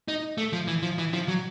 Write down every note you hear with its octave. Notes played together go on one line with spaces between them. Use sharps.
D#4
A3
F3
E3
F3
E3
F3
F#3